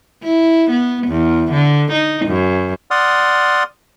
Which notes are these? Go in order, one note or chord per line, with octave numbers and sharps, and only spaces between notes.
E4
B3
E2
D3
D#4
F#2
D5 F#5 C6 D#6 F6